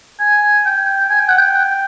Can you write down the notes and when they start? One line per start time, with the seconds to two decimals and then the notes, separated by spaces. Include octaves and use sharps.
0.19 G#5
0.65 G5
1.10 G#5
1.19 G5
1.29 F#5
1.38 G5